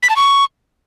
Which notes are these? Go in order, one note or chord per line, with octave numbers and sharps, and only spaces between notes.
B6
A5
C#6